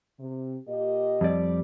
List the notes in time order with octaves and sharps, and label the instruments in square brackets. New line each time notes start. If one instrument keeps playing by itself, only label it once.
[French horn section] C3
A#2 G4 D#5
[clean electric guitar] F2 G3 D5